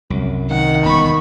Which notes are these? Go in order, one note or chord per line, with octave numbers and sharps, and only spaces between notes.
C2 F#2
D#3 F#5
E1 B3 B5 C#6